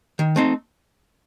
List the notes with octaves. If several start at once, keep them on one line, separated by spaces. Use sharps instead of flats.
D#3
A3 C4 D#4